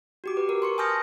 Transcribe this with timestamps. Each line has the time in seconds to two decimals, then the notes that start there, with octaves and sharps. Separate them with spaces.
0.24 F#4 G4 D6
0.37 B4
0.49 A#4
0.62 C6 C#6 C#7
0.78 G#5 A5 D#6 F6 G6 A#6